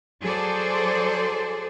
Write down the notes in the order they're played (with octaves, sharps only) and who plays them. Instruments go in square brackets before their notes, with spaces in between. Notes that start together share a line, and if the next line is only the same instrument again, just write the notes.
[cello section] F#3 G#4 A4 C5 D5